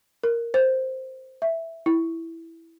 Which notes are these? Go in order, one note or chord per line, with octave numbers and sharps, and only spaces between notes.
A#4
C5
E5
E4